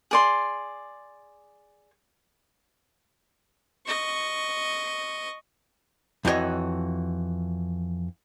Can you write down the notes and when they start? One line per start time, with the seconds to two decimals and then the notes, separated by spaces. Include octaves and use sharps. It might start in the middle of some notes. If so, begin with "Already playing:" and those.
0.11 G#4 D5 C6
3.86 D#5 C#6
6.25 F2 E3 D#4 F#4 C#5 D#5